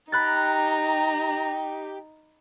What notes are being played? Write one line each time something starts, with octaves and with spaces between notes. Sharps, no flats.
D#4 G4 G5 A#5 B5 F#6 A6